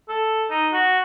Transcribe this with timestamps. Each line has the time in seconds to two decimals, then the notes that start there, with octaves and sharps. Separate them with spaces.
0.09 A4
0.50 D#4
0.73 F#4